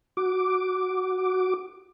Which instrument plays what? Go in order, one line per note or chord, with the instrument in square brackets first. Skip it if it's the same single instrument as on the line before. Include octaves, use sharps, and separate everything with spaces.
[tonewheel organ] F#4 D6